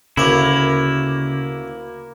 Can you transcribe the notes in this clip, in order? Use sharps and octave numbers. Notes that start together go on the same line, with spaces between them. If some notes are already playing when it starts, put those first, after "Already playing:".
D2 C#3 A#3 E4 C#5 B5